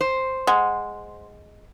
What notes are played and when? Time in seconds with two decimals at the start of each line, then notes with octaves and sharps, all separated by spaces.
0.01 C5
0.47 G#3 F#5